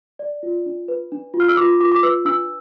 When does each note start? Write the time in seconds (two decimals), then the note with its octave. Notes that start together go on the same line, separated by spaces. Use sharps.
0.19 D5
0.43 F4
0.66 D4
0.88 B4
1.12 D4
1.34 F4
1.40 F6
1.48 E6
1.57 F4 D6
1.80 F4 D6
1.92 D6
2.03 B4 E6
2.25 D4 E6